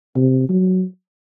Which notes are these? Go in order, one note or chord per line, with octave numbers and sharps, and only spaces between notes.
C3
F#3